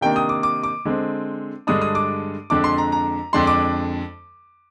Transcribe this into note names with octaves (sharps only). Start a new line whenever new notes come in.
C3 D#3 A#3 D4 G5
D#6
D6
D6
D6
D3 G#3 C4
G2 D3 G#3 D4 D#6
D#6
D6
F2 D3 G#3 D4 D6
C6
A#5
A#5
F2 D3 G#3 D4 C6
D6